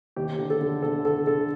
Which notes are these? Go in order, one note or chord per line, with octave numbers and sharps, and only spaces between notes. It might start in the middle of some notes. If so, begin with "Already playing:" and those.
D#2 G4
D3
A4
D3
D3 A4
D3 A4
D3 A4